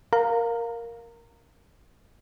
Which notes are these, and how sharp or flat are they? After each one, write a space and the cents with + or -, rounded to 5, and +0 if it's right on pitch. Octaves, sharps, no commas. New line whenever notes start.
A#4 +0 F5 +10 A#5 -20